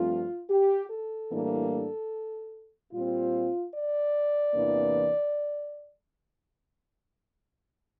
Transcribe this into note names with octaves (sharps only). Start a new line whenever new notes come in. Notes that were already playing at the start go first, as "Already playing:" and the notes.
Already playing: G2 F3 A3 C4 F4
G4
A4
A2 E3 G3 A#3 D4
A#2 G3 C4 F4
D5
E2 C3 E3 A#3 D4